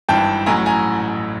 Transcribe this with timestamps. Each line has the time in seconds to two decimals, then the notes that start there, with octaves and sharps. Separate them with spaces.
0.08 G#1 G2 E3 G5 A5
0.46 A1 A2 F#3 G#5 A#5
0.66 G#5 A#5